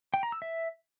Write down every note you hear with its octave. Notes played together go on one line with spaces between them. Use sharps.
G5
A#5
E6
E5